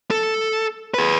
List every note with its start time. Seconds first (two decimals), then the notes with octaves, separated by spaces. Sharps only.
0.10 A4
0.94 G#4 B4